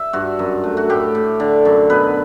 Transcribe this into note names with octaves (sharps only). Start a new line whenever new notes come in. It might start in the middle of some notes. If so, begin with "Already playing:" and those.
Already playing: E5
G2 F#4
F#2
A3
F#4
A2 G4
A2
D3
F#2
B2 B4